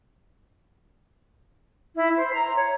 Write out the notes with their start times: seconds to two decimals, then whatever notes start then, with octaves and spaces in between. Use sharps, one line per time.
1.95 E4
2.17 C5
2.32 A#5
2.55 C#5